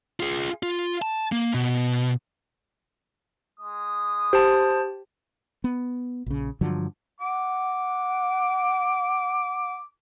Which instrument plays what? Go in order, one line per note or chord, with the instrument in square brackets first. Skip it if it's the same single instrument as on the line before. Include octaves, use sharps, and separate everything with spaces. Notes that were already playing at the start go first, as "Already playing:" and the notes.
[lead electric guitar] F4 G#4
F4
A5
A#3
B2
[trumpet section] G#3 D#6
[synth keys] G4 [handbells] C5 A5
[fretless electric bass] B3
A#1 C#3
G2 D3 F3 F#3
[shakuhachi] F#5 [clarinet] D6